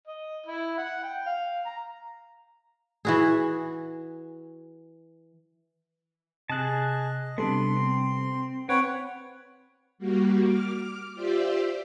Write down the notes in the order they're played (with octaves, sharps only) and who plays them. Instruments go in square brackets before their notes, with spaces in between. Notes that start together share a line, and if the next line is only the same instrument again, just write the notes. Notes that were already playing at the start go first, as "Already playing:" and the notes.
[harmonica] D#5
E4
F#5
G5
F5
A#5
[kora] E3 F#4 G#4
[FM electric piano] C3 F#6 [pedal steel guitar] G#4 A5 [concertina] D#5
[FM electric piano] C3 G3 A4 [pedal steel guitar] B3 D4 [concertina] C6
[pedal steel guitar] C4
[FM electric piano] C4 [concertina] B4 C#5 F#5 [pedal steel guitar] G5
[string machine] G3 A#3 F#4
D6 F6
F4 G4 C5 D5 E5